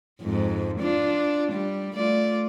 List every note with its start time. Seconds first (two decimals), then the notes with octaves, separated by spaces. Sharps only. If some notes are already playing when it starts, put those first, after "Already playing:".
0.22 F2 G#2
0.80 D4 F4
1.52 G3
1.95 A3 F4 D5